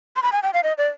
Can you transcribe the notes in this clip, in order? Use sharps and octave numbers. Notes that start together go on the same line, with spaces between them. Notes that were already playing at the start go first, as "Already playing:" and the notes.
C6
B5
G#5
G5
F5
D#5
D5